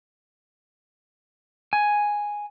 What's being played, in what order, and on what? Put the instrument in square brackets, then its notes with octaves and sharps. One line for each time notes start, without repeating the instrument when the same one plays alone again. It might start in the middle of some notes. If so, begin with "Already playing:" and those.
[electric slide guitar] G#5